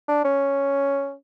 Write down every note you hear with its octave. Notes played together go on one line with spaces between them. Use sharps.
D4
C#4